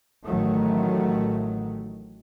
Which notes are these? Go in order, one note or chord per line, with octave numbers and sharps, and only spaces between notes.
A1 D#3 F#3 A3